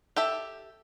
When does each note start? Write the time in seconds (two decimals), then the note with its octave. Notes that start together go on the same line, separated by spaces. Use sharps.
0.16 G4 A4 E5